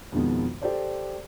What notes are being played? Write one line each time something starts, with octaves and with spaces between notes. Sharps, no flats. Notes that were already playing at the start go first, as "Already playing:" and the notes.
F2 B2 D#3 G#3 B3
G4 A4 C5 D5